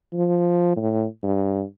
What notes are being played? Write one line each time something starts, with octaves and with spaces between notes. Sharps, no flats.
F3
A2
G2